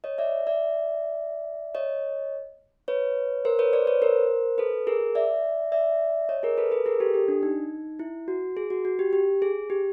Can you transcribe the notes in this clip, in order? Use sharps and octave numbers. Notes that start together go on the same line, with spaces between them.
C#5 D#5
D5 E5
D5 E5
C#5 D#5
B4 C#5
A#4 C5
B4 C#5
C5 D5
B4 C#5
A#4 C5
A4 B4
G#4 A#4
D5 E5
D5 E5
C#5 D#5
G#4 A#4
A4 B4
A4 B4
G#4 A#4
G4 A4
G4
D4
D#4
E4
F#4
G#4
F#4
F#4
G4
G4
G#4
G4